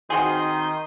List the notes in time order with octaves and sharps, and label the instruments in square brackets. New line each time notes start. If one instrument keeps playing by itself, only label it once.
[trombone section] D#3 [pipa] C4 F#4 G#4 [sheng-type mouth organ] C6 D#6 G6